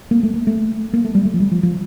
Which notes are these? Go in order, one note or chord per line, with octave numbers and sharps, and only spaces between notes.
A#3
A3
A#3
A3
A#3
A3
G3
A3
F3
G3
F3
F3